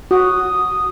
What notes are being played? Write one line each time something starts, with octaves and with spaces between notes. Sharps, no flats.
F#4 D#6